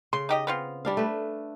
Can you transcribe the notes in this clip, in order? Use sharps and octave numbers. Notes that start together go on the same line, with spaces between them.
C#3 C6
D#4 G4 D#5
B3 C4 F4
G3 D4 F5
A3 B4